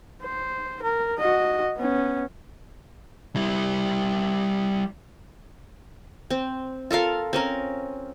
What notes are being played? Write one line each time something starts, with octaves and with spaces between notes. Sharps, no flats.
C5
A#4
F#4 D#5
B3 C#4
G3 E4
C4
F4 A4 A#4 F5
C4 C#4 A#4